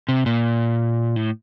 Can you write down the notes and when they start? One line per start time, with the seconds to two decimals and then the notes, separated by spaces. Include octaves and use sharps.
0.09 C3
0.26 A#2
1.16 A2